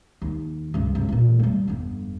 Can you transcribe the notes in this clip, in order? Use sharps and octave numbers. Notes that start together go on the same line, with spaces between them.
D#2
C#2 G2
C#2
A#2 E3
G3 A3
G1 F2